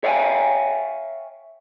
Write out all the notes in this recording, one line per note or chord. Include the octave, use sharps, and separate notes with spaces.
C#5 E5 F5 G5 G#5